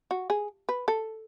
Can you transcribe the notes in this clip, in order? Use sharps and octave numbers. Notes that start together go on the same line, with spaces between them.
F#4
G#4
B4
A4